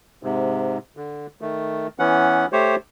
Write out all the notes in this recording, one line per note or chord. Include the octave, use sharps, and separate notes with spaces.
G#2 C3
D3
D#3 A3
E3 B3 C#4 F#5
A3 G4 C5 C#5